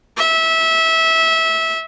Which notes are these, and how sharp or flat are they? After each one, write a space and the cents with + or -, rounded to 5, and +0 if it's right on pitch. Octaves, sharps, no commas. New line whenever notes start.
E5 -20